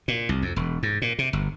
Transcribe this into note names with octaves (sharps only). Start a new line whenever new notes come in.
A#2
C2
F2
E1
G#2
A#2
C3
G1